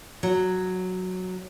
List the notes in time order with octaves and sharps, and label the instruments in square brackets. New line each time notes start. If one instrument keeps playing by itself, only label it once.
[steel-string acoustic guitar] F#3